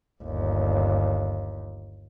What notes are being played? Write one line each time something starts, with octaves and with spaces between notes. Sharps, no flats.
G1 D#2